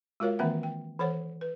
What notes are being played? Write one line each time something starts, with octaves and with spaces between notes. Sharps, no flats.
G#3 F4 F#4 A#4 C#5 F5
D#3 E3 A#3 C4 E5 F#5
G5
E3 A4 C5 C#5 F#5
B4